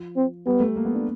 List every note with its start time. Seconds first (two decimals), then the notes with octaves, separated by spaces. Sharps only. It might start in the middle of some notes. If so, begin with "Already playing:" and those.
Already playing: F3
0.17 C4
0.46 G3 B3
0.60 A3
0.76 A#3
0.85 B3
0.94 D4